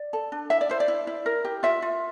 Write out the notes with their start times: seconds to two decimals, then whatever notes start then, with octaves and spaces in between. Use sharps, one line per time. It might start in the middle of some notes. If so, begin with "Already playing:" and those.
Already playing: D5
0.13 A4
0.32 D4
0.50 E4 E5
0.61 D5
0.69 E4 C5
0.80 D5
0.88 E4
1.07 E4
1.26 A#4
1.45 G4
1.63 F4 E5
1.82 F4